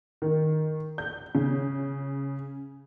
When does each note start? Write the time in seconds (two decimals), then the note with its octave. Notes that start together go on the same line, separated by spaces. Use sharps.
0.22 D#3
0.98 G6
1.35 C#3